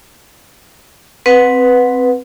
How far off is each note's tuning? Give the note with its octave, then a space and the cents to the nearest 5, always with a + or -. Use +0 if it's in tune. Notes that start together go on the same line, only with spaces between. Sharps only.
C4 +0 B4 +0 F#5 -20